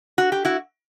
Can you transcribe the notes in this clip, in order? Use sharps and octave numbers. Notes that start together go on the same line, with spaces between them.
F#4
G4
E4 F#4